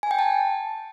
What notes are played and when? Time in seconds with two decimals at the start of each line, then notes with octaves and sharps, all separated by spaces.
0.03 G#5
0.11 G5
0.19 A5